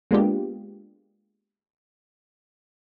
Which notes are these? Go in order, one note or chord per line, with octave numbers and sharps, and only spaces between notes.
G#3 A#3 B3 D4 F4 G4